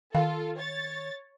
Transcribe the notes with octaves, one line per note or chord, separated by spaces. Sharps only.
D#3 F4 A4 F5
C#5 A6